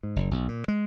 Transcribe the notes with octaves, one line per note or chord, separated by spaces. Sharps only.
G#2
F#1
B1
A#2
G#3